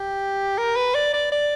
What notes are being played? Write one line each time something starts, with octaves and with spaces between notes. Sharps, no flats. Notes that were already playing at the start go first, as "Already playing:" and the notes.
Already playing: G4
A#4
B4
D5
D5
D5